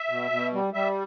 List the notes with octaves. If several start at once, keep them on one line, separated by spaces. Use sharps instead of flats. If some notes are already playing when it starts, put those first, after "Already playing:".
Already playing: E5
B2
B2
G3
G3 E5